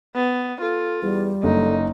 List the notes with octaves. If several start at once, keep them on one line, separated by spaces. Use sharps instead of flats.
B3
F4 A4
E2 G3
F#1 D3 D#4